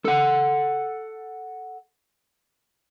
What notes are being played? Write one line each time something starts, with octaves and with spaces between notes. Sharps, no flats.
A4 F#5